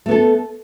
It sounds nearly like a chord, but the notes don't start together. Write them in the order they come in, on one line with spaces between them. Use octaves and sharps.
A3 B3 A4